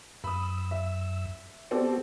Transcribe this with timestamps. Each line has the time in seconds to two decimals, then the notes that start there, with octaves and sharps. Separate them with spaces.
0.24 F#2 B5 D#6 E6
0.71 E5
1.71 B3 C4 F#4 G4 A4 D5